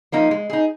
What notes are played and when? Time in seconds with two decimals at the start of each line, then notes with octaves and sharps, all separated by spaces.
0.12 F3 A#3 D#4
0.31 G#3
0.50 D#4 G#4